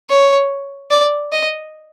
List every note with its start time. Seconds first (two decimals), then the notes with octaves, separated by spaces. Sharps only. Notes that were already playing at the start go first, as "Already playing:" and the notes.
0.10 C#5
0.91 D5
1.32 D#5